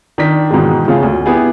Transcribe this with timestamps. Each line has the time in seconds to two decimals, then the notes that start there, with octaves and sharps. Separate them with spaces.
0.18 D#3 D4 B6
0.51 G#2 B2 D#3 E3 G#3
0.88 C#3 A3 F4 G#4
1.03 D2
1.26 B3 E4 G4 G#4